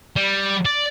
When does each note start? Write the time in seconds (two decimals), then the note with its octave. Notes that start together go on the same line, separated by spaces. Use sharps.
0.16 G3
0.65 D5